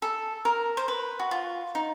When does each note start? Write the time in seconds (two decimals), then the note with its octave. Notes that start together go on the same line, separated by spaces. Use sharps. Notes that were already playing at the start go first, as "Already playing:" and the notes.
0.02 A4
0.45 A#4
0.77 C5
0.88 B4
1.19 F#4
1.31 F4
1.75 D#4